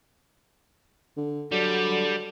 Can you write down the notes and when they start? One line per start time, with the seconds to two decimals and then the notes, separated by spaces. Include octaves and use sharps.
1.17 D3
1.52 D3 F#3 G3